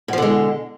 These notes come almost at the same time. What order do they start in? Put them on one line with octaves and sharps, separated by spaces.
B2 F3 D3 G#3